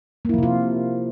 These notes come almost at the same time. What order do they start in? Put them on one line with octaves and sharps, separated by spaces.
A#3 E4 F3 C3 F4